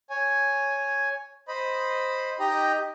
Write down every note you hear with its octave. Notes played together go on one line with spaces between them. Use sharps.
C#5 G#5
C5 D#5 B5
D#4 G4 D#5 G5 A#5